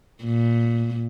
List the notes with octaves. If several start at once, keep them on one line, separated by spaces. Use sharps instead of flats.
A#2